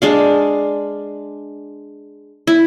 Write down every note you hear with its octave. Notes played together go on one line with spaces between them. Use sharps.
G#3 D4 F5
E4